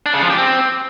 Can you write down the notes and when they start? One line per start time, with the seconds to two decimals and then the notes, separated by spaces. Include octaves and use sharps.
0.06 D4
0.14 C#3
0.22 F3
0.30 G4
0.38 C4